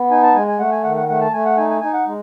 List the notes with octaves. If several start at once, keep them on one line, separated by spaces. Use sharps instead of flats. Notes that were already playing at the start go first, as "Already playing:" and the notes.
Already playing: B3
D#4 G#5
A5
G#3 G#5
G#5
A3 F#5
G#5
D#3 F#5
F#5
A3 F#5
A5
A3 G#5
F#5
D#4 G#5
G#5
D#4 G#5
F#5
G#3